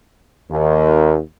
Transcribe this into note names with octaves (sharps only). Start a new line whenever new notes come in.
D#2